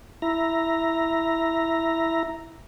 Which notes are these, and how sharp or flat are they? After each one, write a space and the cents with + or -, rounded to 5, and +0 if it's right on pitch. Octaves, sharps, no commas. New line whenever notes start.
E4 +0 A#5 +0